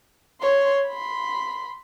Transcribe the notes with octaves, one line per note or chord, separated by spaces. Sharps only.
C#5 C6
B5 C6